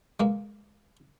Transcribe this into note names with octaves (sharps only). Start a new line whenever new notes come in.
G#3 A#3